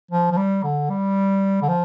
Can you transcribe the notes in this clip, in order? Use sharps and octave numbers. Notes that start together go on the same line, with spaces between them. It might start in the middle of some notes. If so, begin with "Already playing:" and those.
F3
F3
G3
D3
G3
D3
F3